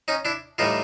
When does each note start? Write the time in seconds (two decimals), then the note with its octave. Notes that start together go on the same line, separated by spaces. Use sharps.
0.08 C#4 D#4
0.25 D4 E4
0.58 A2 E3 G3 D#4 F4